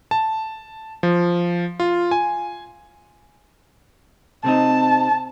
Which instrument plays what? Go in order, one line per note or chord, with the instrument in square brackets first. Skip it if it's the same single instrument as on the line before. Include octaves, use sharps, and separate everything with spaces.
[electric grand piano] A5
F3
F4
G#5
[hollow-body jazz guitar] C3 C4 D#4 [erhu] A5